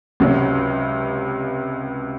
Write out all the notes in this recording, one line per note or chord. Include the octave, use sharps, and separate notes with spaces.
C#2 C3 F#3 C#4